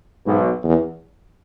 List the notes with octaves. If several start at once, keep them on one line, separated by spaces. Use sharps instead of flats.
B1 G#2 B2
E2